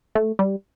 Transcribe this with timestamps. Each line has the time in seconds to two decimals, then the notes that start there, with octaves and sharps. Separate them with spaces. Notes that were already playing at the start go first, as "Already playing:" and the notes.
0.15 A3
0.39 G3